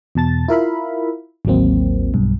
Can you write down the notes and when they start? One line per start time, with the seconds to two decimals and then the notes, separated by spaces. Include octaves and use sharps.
0.15 E2 B2 A5 A6
0.48 E4 F4 A#4 E5 F5 B5
1.45 A1 D#2 F#3 A#3 C4
2.14 B1 G2